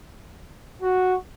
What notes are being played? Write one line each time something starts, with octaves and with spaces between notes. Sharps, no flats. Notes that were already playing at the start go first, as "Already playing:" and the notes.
F#4